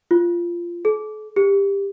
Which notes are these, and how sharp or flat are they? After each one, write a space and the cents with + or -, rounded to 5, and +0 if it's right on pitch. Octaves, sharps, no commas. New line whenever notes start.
F4 -15
A4 -45
G4 +20